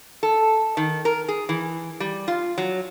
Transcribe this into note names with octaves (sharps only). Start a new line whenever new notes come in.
A4
D#3
A#4
G#4
E3
G3
F4
F#3